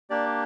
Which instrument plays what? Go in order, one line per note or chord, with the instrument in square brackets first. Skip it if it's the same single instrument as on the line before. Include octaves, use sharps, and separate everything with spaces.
[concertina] A#3 D4 G4 D5